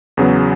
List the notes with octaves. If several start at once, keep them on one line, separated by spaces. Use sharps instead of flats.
E2 C#3 F#3 B3